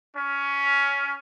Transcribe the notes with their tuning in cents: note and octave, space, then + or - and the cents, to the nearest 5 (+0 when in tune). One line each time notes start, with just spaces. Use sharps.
C#4 +15